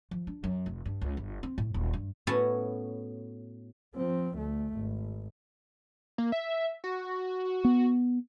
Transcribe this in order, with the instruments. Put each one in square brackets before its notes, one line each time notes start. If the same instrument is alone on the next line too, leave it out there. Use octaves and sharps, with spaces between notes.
[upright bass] F3
D4
F#2
F1
G2
C#2
G1
C4
A2
D#1
G2
[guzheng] A2 B3 C#4 F#4 C#5 A5
[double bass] F3 C4
D2 A3
G#1
[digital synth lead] A#3
E5
F#4
[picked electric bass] B3